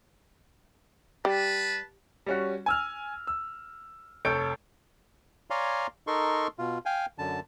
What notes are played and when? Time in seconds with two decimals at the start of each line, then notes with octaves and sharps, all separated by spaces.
1.25 G3 B4 A5
2.26 G3 C#4 F#4
2.66 G#5 E6 F6
3.27 E6
4.25 F1 A4 C#5 G6 D7
5.50 C#5 D5 F5 G#5 A#5 C6
6.07 D#4 A4 A#4 C6 C#6
6.59 B2 F4
6.86 F5 G5 G#5
7.18 F#2 D3 A5